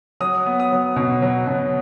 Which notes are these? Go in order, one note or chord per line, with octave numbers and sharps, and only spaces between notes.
F#3 D#6
B3
D#6
F#3
B2
F#3
B2